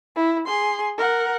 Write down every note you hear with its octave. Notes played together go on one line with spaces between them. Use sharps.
E4
G#4 C6
A#4 F#5